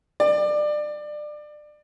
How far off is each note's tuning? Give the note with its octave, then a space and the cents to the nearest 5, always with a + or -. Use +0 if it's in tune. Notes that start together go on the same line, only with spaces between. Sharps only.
D5 +25